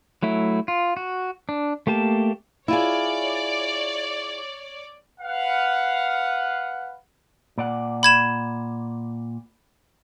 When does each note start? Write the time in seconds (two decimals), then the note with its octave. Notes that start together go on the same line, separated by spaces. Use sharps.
0.23 F#3 A3 E4
0.68 F4
0.97 F#4
1.49 D4
1.87 A3 A#3 G4 A5
2.68 E4 F4 G#4 C#5 D5
5.21 B4 F5 F#5
7.58 A#2 D5 F#5
8.03 B5 G#6 E7